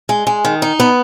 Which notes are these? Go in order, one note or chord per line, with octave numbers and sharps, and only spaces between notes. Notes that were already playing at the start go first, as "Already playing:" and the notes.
G#3
G#3
D#3
D#4
B3